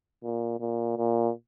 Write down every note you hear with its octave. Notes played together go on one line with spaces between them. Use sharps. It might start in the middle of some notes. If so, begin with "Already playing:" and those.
A#2
A#2
A#2